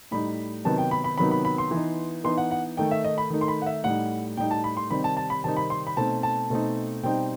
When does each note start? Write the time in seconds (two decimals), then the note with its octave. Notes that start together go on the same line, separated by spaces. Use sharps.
0.11 A2 G3 D#4 B5
0.65 C3 D#3 F#3 B3 D#4 A5
0.78 G5
0.91 B5
1.04 B5
1.18 C3 D#3 F#3 B3 D#4 B5
1.31 B5
1.45 B5
1.58 C6
1.71 E3 B3 D#4
2.24 E3 B3 D#4 C6
2.38 F#5
2.51 F#5
2.77 D#3 A3 D#4 G5
2.91 E5
3.04 D#5
3.18 B5
3.30 D#3 A3 D#4
3.41 C6
3.48 B5
3.62 F#5
3.66 E5
3.84 A2 G3 D#4 F#5
4.37 A2 G3 D#4 G5
4.51 A5
4.64 B5
4.77 C6
4.90 C3 D#3 G3 C4 D#4 B5
5.04 A5
5.17 A5
5.30 B5
5.44 C3 D#3 G3 C4 D#4 A5
5.57 B5
5.70 C6
5.87 B5
5.97 B2 A3 C4 D#4 A5
6.23 A5
6.50 B2 A3 C4 D#4
7.03 B2 G3 C4 D#4 G5